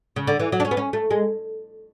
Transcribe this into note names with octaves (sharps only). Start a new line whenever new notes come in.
C#3
D3
E3
F#3
D4
C#4
B3
C#4
A3
G#3